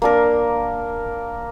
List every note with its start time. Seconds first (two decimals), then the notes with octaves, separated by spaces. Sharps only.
0.02 A#3 D4 A#4